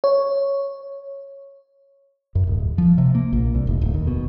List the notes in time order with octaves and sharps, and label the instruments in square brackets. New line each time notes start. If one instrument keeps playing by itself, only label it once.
[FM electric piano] C#5
[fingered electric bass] F#2
D1
F3
C3
A#3
A#1
C2
F1
D1
D#2
B2